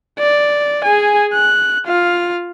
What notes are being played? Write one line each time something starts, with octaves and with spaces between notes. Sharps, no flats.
D5
G#4 G#5
F#6
F4 F5